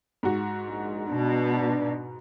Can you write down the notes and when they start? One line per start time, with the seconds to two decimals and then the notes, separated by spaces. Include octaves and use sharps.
0.23 G#2 F#4
0.66 A#1 G#3
1.07 B2 D4